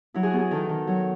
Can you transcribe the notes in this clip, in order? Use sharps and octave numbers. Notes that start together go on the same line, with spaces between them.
F#3 E4
F#4 G#4
B3
G#4
D#3 A4
D#3
F#3